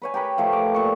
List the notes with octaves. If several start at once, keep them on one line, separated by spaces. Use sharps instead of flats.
B4 C#5 G#5
G4 A#4 B4
F3 A3 F4
D6
A#2 C#6